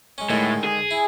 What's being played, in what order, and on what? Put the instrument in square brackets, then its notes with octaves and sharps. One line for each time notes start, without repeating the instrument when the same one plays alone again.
[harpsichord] G#3 C#4
[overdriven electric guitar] A2 [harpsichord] D3 D#3 G#3
[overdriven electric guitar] G#4
[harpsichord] E4